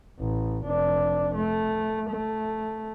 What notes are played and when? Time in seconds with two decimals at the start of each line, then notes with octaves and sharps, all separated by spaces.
0.20 A1
0.66 F1 D4
1.34 A3
2.10 A3